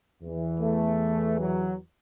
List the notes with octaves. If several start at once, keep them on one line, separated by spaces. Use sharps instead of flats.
E2 E3
A3
F#3